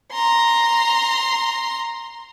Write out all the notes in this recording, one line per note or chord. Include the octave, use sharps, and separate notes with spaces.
A#5 C6